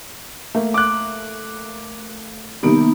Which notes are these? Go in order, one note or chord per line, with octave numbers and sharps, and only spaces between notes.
A3 A#3
D6 F#6
C3 D#3 G3 A#3 B3 D#4